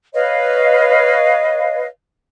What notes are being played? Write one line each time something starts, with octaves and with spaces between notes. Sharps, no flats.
B4 C#5 D#5 F5